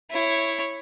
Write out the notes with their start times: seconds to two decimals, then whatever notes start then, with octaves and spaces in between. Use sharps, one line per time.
0.11 E4 C#5